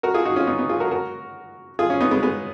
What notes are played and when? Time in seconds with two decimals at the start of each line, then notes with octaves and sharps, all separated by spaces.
0.03 F#4 A#4
0.14 F4 G#4
0.25 D#4 F#4
0.36 C#4 F4
0.47 B3 D#4
0.58 B3 D#4
0.69 F4 G#4
0.80 F#4 A#4
0.91 F#4 A#4
1.79 F4 G#4
1.90 C#4 F4
2.00 B3 D#4
2.11 G#3 B3
2.22 G#3 B3